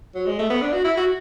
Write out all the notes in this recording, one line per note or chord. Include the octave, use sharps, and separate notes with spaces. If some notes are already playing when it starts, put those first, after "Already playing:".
F#3
G#3
A3
B3
D4
F#4
E4
F#4